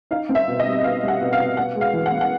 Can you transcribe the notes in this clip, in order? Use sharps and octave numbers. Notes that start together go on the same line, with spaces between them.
D#4 F5
C4
E5
B2
D#5
G3
B2 F5
G3
F#5
B2
F5
B2
B3 F#5
G#3
F5
E3
F#5
B3
F#5